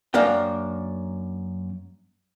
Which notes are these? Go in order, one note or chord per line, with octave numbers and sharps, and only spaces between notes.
F#2 A#3 D4 A#4 G5